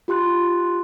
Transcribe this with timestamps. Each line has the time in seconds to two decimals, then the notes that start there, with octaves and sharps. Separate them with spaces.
0.08 F4 G4 C6 F#6